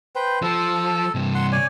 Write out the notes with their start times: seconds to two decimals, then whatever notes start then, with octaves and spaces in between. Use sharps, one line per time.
0.16 B4 C5 G5
0.42 F3 A4
1.15 G2 C3
1.35 F#5 C6
1.52 C#5 D5 G#5